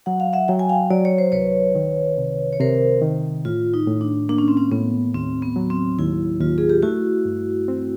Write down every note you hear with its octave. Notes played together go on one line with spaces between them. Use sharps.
F#3 F#5
F5
E5 F#5
F#3 G5
G#5
F5 G5
F#3 D5
C#5
C5
C2 B4 C#5
D#3
C3
C#5
C3 A#4 C5
D#3
A2 F4
D#4
A2
D4
A#3 D4
C#4
C4
C#4
A2 B3
D#2 C4
B3
F#3
C4
D#2 E4
D#2 F4
G#4
G4
A3 E4 F#4
G2
C4